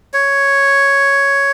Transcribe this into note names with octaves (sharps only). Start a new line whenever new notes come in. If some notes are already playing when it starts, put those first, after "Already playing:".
C#5